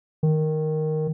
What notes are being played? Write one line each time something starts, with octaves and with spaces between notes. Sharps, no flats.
D#3